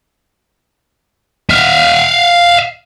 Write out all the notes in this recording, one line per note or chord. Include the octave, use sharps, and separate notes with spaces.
E5 F5